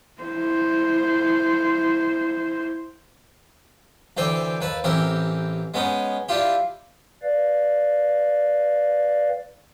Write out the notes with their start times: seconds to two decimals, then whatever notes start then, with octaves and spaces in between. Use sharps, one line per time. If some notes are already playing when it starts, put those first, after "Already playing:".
0.22 E4 C5
4.17 D2 E3 C5 D5 G5 D6
4.61 D#2 B4 A5
4.84 A1 E3 C4 G4 A#4
5.74 G#3 B3 C#4 D#4
6.29 D4 E4 F4 G4
7.22 B4 D5 F5